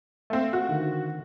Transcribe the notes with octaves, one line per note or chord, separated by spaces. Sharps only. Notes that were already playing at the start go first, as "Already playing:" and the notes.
A3 C4 E5 F5
F#4
D3 D#3